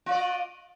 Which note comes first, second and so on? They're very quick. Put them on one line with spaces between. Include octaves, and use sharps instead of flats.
F4 D5 D#5